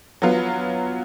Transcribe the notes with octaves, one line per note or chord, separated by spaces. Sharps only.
F#3 B3 F4